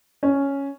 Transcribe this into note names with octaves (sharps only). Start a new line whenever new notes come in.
C#4